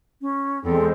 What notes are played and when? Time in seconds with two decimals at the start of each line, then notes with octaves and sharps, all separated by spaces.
0.21 C#4
0.64 E2 G#3 C4 A4